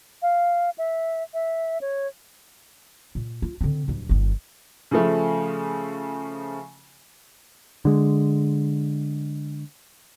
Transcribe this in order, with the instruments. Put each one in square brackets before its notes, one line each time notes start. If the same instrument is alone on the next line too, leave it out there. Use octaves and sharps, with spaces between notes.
[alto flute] F5
E5
E5
C#5
[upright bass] A#2
F4
D3 C4
D1 G2
G1 D#3
[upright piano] C#3 F3 A3
[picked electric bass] D3 G#3